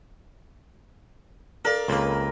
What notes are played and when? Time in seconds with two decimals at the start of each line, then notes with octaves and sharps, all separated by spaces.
1.65 A4 A#4 D5 F5
1.88 C#2 A#3 C4 A4 B4